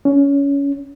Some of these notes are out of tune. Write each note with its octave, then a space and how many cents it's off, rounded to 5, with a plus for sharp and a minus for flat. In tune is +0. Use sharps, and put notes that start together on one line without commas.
C#4 +20